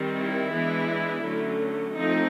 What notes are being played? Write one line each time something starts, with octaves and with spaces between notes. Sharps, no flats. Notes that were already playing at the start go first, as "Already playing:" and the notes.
Already playing: D#3 G3 C4
E4
E3 G#3 B3 D4
D3 F#3 A3 C#4
F3 A3 C4 D#4